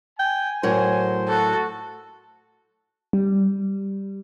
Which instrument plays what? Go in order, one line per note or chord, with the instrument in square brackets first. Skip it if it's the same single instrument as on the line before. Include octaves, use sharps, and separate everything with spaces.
[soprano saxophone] G5 [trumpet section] G#5
[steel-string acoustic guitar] A2 F#3 A#4 [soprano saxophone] C5
[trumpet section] F#4 [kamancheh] A4
[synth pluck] G3